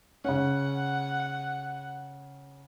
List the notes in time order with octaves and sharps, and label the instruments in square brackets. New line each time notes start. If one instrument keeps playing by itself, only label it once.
[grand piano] C#3 C#4 [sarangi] F#5